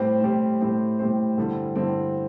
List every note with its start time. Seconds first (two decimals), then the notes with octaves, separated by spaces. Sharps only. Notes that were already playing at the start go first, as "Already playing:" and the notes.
Already playing: A2 G3 C4 G4 C5
0.22 A2 G3 C4 G4 C5
0.61 A2 G3 C4 G4 C5
0.99 A2 G3 C4 G4 C5
1.38 G2 D3 G3 C4 E4
1.76 G2 D3 G3 C4 E4